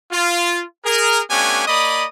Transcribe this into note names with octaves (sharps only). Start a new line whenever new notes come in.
F4
G#4 A#4
A3 B3 C#4 D4 G4 G#5
A#3 D5 D#5 B5 D#6